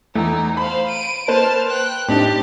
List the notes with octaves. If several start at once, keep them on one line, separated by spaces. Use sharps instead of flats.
E2 A3 D#4
C5 F5 B5
D7 D#7
A#3 B4 C5 A5 F6
G5 F#6
A2 C4 D4 D#4 G4